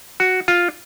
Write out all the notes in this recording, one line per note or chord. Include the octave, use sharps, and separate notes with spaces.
F#4
F4